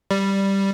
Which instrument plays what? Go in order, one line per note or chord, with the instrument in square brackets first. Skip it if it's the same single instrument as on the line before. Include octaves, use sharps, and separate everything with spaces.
[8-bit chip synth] G3